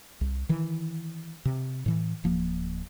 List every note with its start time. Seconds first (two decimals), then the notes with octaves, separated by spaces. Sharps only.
0.21 C2
0.49 D#3 E3
1.45 C3
1.86 A2 E3
2.24 D1 F3 A#3